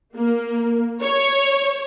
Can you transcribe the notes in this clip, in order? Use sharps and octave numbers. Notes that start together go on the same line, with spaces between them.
A#3
C#5